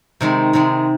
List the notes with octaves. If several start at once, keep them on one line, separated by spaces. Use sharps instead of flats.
C3 D#3 G#3
C3 D#3 G#3